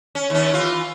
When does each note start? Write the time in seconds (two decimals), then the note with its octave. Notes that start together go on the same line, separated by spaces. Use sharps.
0.15 C#4
0.30 D#2 C#4
0.54 E3 F4